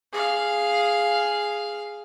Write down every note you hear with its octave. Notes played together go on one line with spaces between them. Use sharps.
G#4 F5